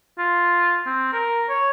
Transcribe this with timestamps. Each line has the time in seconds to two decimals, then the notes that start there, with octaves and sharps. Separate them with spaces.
0.18 F4
0.86 C4
1.13 A#4
1.49 C#5